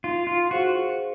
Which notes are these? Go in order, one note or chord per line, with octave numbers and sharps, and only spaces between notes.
D#4 F4
F4
F#4 G#4 C5 F5